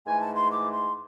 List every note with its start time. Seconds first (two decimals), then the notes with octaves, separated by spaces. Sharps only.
0.06 G#2 E3 A3 G#5
0.21 A5
0.36 C6
0.51 D6
0.72 C6